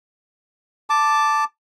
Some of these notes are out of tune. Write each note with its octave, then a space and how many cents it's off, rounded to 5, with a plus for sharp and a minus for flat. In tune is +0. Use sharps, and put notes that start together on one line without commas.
A5 +0 D6 +0